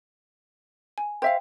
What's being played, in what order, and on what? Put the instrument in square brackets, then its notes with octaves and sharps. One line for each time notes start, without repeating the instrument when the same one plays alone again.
[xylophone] G#5
[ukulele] C5 E5 F5 [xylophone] G5